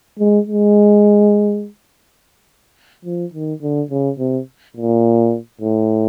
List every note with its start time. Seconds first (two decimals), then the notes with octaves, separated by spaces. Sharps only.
0.19 G#3
0.47 G#3
3.05 F3
3.34 D#3
3.62 D3
3.91 C#3
4.19 C3
4.77 A#2
5.61 A2